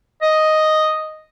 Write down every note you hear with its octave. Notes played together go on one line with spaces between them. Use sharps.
D#5